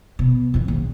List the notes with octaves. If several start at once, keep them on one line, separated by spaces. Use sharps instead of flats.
B2
F2 D#3
A#1